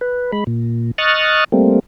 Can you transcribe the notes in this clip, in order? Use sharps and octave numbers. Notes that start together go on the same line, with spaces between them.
B4
G#3 B5
A#2
D#5 C#6 D#6 F6 F#6 A6
G3 A3 A#3 C4